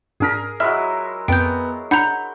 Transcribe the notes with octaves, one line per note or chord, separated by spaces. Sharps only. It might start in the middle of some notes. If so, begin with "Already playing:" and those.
G#2 D4 G#4 A#4 B6
F#3 G#3 E4 E5 F6
F2 B3 G5 G6
D4 F#5 A#5 B5 G6